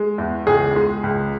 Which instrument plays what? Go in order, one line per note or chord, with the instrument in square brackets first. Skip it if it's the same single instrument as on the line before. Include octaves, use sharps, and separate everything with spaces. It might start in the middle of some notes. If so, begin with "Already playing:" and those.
Already playing: [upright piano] G#3
E2
C#2 G#4
G#3
C#2